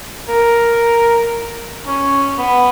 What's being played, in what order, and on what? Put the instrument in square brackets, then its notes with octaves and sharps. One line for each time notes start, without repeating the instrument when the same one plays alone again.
[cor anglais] A#4
C#4
B3